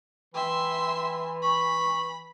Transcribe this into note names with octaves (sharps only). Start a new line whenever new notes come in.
E3 E5 G5 C6
B5 C#6